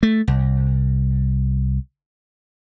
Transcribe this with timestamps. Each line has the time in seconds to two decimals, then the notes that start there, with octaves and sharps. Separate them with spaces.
0.03 A3
0.28 C2